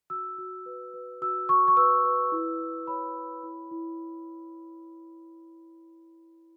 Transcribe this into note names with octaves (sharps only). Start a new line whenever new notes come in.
F#4 E6
F#4
B4
B4
F#4 E6
F#4 C#6
C#6
B4 E6
B4
E4
E4
C#5 B5
C#5
E4
E4